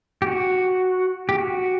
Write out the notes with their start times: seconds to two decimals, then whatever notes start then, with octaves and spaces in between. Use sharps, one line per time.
0.22 G4
0.27 F#4
1.29 G4
1.38 F#4